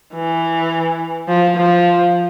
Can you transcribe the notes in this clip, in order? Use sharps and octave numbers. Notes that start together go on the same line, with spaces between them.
E3
F3
F3